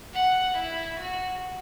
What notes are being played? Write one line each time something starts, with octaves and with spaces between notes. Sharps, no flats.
F#5
E4
F#4